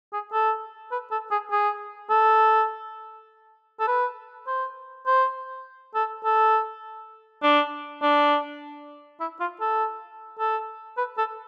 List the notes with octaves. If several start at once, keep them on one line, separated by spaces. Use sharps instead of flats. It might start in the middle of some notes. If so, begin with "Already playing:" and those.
G#4
A4
B4
A4
G#4
G#4
A4
A4
B4
C5
C5
A4
A4
D4
D4
E4
F4
A4
A4
B4
A4